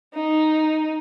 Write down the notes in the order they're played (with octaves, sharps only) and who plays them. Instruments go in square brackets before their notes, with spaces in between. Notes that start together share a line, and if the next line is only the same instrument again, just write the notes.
[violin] D#4